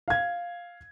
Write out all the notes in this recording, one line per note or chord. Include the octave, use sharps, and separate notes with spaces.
F5 G#6